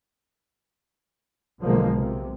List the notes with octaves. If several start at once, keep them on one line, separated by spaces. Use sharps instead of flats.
B1 D3 F3 G#3 A#3
C3